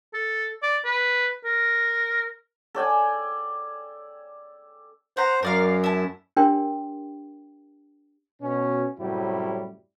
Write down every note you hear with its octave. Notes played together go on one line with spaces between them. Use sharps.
A4
D5
B4
A#4
A4 D5 G5 G#5
C5 F#5 A#5
F#2 A#4 D5 F5
E4 A5
D4 G4 A#4 C#5 G5 C6
B2 C#4
F#2 A2 C3 F#3 G3 E4